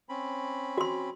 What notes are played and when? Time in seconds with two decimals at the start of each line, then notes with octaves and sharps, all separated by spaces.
0.09 C4 C#4 B5
0.78 F#4 C6